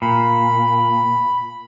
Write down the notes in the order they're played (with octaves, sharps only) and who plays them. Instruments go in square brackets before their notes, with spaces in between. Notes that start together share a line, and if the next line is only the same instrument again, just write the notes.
[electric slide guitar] A#2 [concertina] B5